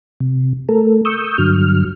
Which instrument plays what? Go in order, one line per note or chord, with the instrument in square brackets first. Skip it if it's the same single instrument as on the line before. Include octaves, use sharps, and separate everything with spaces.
[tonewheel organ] C3
A3 A4 A#4
C#6 D#6 E6 G6
G2 D3 F#3 F6